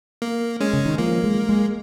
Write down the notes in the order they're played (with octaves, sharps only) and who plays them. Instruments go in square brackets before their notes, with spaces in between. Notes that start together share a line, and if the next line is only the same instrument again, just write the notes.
[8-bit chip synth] A#3
G#3 C#4
[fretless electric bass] C#3
D#3
[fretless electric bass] F3 [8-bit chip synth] A#3
[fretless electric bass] G#3
G#3